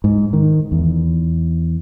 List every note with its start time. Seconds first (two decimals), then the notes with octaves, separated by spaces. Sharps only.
0.04 G#2
0.33 D#3
0.72 E2